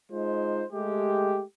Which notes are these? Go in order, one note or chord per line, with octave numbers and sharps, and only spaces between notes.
G#3 D#4 F4 C5
G#3 A3 G4